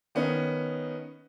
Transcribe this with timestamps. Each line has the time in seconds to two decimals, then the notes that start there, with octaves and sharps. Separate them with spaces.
0.15 D#3 B3 C#4 D#4